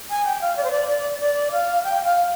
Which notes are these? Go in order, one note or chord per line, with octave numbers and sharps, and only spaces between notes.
G#5
G5
F5
D5
C5
D5
D5
D5
F5
G5
F5